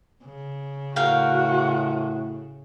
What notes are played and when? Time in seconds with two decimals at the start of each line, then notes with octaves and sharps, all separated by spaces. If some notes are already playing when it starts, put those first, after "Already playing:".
0.25 C#3
0.96 A2 F#4 A#4 F5 G5